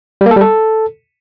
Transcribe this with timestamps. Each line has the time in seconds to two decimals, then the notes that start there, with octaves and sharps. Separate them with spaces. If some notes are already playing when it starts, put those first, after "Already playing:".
0.21 G3
0.26 A#3
0.31 A4
0.36 G3
0.41 A4